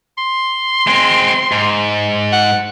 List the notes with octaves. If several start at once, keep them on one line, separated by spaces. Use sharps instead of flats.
C6
G#3 C4
G#2
F#5